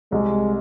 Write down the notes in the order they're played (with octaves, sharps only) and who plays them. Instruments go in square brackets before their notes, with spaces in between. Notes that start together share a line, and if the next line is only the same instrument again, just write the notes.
[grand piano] C2 [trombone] G#3